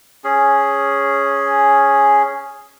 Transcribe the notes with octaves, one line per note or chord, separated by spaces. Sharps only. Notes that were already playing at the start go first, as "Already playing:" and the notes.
C#4 G#4